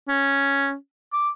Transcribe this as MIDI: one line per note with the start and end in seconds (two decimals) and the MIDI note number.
0.08 0.74 61
1.13 1.30 86